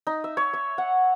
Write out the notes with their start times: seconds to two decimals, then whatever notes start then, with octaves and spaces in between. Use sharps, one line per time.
0.07 D#4
0.24 E5
0.37 C#5
0.53 E5
0.78 F#5